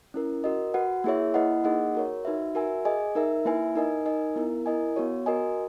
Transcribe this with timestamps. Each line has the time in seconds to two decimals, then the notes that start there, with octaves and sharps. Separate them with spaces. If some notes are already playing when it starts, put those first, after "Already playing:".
0.14 C#4 E4 A#4
0.44 F#4 A#4 D#5
0.74 F#4 B4 F#5
1.04 A#3 E4 G#4 C#5 E5
1.34 A#3 E4 B4 D#5 F#5
1.64 A#3 D#4 G#4 D#5 F#5
1.95 F#4 A#4 C#5
2.25 D#4 F#4 B4 E5
2.55 F#4 A#4 E5 G#5
2.85 G#4 D#5 G#5
3.15 D#4 A#4 E5
3.45 A#3 E4 B4 E5 G#5
3.76 D#4 A#4 D#5 G#5
4.06 D#4 A#4 D#5 G#5
4.36 B3 E4 A#4
4.66 E4 A#4 D#5 G#5
4.96 B3 F#4 C#5
5.26 F#4 A#4 D#5 G#5